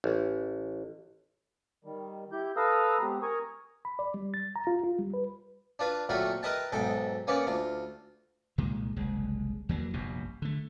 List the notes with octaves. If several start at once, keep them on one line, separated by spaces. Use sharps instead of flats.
A1
D#3 G3
E4 G4 G6
A4 B4 F5 A#5 D#6 E6
G#3 B3 C4 G4
A#4 G#5 A#5 C#6 D#6
B5
D5
G3
A6
A#5
F4
F4
G3
B4
D4 F4 B4
A#2 F#3 A3 C4 F4 F#4
A#4 B4 D#5 E5 G5 A5
B1 G#2 A4 E5 G5
A#3 B3 C#4 D5
D2 F4
C2 A#2 D#3 G#3
F#1 C2 G#3
E2 E3 F#3 A#3
F1 A#1 G2 B2
D3 A3